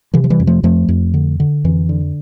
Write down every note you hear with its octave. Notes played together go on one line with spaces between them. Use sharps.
C3 E3
F3
E3 G3
F2
F3 A3
F2 F3 A3
F2
D3
D3
F2 E3
D3